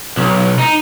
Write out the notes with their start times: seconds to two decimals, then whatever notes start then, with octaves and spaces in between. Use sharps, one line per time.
0.17 B1
0.59 D#4